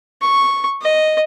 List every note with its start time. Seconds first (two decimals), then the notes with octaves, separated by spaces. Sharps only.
0.21 C#6
0.81 D#5